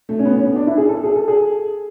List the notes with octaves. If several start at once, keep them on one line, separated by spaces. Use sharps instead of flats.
A3
C#4
B3
C#4
B3
D4
E4
G#4
A4
G#4
A4
G#4